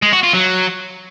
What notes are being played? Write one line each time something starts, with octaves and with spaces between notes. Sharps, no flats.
G#3
F#4
F4
F#3